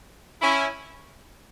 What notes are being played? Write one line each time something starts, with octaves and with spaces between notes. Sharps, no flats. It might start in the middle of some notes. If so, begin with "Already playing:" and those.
C#4 E4